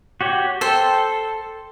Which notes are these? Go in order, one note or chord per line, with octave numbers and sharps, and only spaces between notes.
F#4 G4 C#5
A4 C5 G5